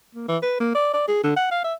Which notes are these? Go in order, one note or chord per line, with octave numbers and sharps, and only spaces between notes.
A#3
E3
B4
A#3
D5
D5
G#4
D3
F#5
F5
E5